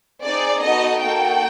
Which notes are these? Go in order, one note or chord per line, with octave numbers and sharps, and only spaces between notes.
C4 D#4 G#4 D5
B3 D#4 F#4 A4 D#5
A#3 D#4 F#4 A4 G5